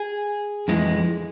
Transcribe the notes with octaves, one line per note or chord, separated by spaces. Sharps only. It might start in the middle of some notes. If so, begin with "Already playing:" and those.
Already playing: G#4
F2 E3 G#3